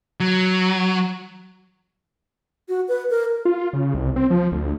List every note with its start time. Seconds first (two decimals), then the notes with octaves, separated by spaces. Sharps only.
0.20 F#3
2.69 F#4
2.88 B4
3.10 A#4
3.45 F4
3.73 C#3
3.94 C2
4.16 C4
4.30 F3
4.52 D2